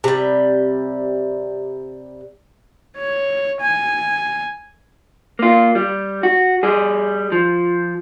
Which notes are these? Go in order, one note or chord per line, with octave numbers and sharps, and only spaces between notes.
C3 G3
C#5
G#5
A#3 F4
G3
F#4
G3 G#4
F3